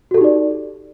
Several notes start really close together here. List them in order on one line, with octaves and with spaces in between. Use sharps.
F#4 A4 G4 D#4 D5